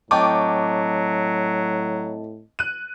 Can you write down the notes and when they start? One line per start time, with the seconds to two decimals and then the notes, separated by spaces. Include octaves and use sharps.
0.11 A2 F#3 C4 D#5 G5 A5 C#6 D6
2.59 F#6 D#7